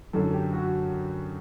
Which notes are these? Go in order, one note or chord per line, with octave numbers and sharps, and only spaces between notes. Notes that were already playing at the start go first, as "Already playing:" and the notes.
F#2 D3 F#3 A4
G4
F#4